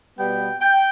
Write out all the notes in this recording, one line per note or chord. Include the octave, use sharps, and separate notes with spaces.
B2 G3 B3 G5
G5